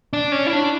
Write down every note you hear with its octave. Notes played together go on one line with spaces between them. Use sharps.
D4
C#4
E4
D4